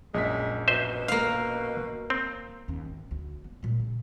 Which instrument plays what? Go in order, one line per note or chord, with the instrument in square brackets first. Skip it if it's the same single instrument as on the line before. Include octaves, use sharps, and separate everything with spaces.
[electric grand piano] A#1 F#2 B6 [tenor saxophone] G#3
[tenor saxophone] B2 [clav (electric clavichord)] C5 D#5 E5
[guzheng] A#3 F5
[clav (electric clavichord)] C4
[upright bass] D#2 C#4
G#1
D2
B3
A#2 G#3
C#3